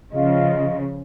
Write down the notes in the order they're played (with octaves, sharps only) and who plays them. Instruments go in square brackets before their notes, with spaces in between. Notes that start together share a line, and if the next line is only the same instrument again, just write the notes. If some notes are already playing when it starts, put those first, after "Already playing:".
[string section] C#3 F3 [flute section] F4 D#5